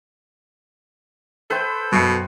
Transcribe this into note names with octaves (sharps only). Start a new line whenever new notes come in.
A4 B4 C5 G5
F#2 B2 C7 C#7